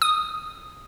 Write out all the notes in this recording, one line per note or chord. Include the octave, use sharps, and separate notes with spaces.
D#6